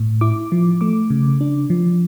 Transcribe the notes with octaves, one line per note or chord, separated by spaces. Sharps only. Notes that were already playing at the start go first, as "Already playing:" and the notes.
Already playing: A2
E4 D6
F3
A3 D6
C#3
D4
F3